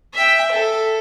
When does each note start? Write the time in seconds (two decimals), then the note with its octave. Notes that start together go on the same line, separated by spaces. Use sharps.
0.14 E5 G5
0.51 A4